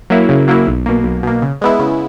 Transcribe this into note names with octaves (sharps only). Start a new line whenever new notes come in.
F#3 A#3 E4
C#3
F#3 A#3 E4
B1
B2 A#3
B1
B2 A#3
C#3
G#3 B3 E4
C#3